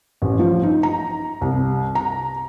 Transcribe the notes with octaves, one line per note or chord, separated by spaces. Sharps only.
A1
F3
D#4
A#5
C2
A#5